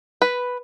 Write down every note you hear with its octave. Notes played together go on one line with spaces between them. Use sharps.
B4